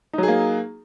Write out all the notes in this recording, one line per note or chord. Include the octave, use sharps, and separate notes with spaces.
F#3 A#3 D#4 G#4